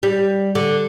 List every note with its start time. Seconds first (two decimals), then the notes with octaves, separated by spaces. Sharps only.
0.03 G3
0.55 D3